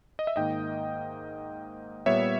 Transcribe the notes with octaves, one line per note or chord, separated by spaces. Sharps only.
D#5
E5
G#2 D#3 A#3 D#5 G5
A#2 G3 B3 C#5 E5